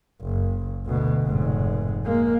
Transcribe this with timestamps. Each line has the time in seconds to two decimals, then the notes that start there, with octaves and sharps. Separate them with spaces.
0.21 F#1
0.86 D2 B2
1.23 F1 G#2
2.05 G#3 A#3